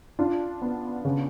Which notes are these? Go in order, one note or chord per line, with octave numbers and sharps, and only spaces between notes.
D4 F4
B3
C#3